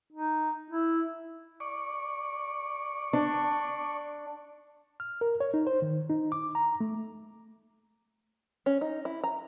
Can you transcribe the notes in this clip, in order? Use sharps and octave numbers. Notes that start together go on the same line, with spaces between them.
D#4
E4
D5 C#6
D4
F6
A#4
C#5
D#4
C5
D#3
D#4
D6
A#5
A3
C#4
D#4
E4
A#5